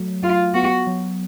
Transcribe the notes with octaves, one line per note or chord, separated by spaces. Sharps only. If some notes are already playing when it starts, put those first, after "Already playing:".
Already playing: F#3 A3
F#3 F4
B3 F#4
F#3